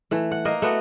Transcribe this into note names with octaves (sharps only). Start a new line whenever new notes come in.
E3 A3
F#5
A#3 D#5
A3 B3 F#4